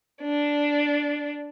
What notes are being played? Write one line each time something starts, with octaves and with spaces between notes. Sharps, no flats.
D4